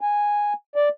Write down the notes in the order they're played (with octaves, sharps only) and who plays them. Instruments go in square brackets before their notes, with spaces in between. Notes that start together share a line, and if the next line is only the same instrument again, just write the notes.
[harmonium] G#5
D5